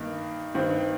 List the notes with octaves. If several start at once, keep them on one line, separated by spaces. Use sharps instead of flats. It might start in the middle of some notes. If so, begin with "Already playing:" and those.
Already playing: G2 D#3 A#3 D#4
G2 D#3 C4